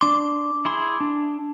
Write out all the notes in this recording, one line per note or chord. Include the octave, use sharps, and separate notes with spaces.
D4 C6 D6
E4 G#4 C6
D4